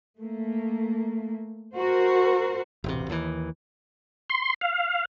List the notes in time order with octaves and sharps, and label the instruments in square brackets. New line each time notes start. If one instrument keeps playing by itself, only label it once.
[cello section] A3 A#3
F#4 A#4 C5
[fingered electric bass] E1 A1 C3
D#2 E3
[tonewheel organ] C6
F5